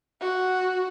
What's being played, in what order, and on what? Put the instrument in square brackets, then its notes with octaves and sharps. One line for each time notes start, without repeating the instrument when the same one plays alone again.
[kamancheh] F#4